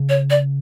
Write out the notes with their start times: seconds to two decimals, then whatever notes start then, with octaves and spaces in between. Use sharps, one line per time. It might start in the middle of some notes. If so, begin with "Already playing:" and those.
Already playing: C#3
0.09 C#5
0.30 D5